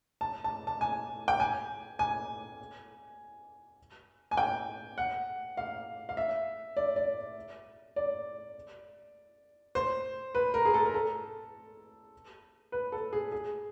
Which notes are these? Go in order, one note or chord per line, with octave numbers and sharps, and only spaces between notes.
A5
A5
A5
G#5
G5
G#5
G#5
G#5
G5
F#5
F5
F5
E5
D5
D5
D5
C5
B4
A#4
G#4
A4
A#4
A4
B4
A4
G#4
G#4